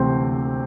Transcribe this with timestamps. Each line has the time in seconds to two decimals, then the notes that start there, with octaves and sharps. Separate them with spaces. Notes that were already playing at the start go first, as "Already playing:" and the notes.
Already playing: D2 C3 E3 C4 C5